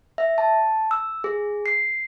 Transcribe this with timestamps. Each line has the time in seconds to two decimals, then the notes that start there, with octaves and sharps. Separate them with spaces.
0.18 E5
0.38 A5
0.91 E6
1.24 G#4
1.66 C7